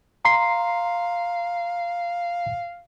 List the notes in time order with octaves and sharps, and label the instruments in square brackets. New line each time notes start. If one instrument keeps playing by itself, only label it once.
[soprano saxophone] F5 [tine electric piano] A#5 C6 C7